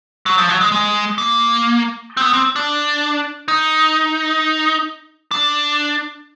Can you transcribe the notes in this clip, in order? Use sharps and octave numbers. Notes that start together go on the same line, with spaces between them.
F#3
F3
F#3
G#3
G#3
A#3
C4
B3
C4
D4
D#4
D4